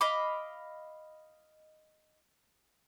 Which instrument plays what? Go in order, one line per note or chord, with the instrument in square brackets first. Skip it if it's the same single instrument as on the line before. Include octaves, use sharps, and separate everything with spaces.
[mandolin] D#5 F5 B5 D6